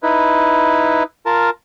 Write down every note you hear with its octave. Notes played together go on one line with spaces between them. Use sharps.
D#4 E4 B4
F4 A#4 A5